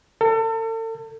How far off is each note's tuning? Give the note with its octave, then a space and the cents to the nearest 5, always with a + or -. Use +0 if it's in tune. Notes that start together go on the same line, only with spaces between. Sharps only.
A4 +35